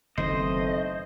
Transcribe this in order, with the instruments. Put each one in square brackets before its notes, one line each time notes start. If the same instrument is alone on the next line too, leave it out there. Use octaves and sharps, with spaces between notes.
[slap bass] F#1 D#3 [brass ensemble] A3 B3 C4 [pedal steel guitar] C5 [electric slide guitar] D#5